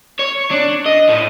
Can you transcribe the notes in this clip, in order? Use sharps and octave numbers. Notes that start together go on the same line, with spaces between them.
C#5
D4
D#5
A2